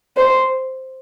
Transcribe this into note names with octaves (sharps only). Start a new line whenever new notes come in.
C5